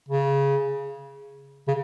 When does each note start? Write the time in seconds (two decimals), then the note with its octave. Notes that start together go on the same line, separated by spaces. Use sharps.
0.08 C#3
1.68 C#3